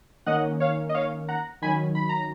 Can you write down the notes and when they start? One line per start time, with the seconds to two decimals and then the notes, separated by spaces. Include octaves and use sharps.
0.26 D#3 A#3 C#4 D#5 F#5
0.60 C#5 F5
0.89 D#5
0.94 C#5 F5
1.28 F#5 A#5
1.62 D#3 F#3 C#4 G#5 B5
1.95 B5
2.09 A#5